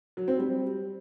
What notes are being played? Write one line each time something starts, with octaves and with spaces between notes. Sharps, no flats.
F#3
C4
G3